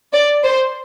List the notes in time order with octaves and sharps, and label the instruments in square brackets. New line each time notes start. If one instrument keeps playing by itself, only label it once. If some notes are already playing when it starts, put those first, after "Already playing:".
[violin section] D5
C5